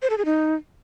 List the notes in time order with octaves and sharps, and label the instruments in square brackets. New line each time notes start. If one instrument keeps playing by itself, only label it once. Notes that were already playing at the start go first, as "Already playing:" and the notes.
[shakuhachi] C5
A4
G#4
D#4